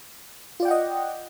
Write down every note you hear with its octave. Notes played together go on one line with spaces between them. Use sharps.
F4 D5 D#5 F#5 G5